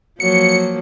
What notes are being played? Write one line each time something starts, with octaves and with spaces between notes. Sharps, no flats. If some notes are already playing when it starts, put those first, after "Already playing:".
F3 F#3 A#3 C#7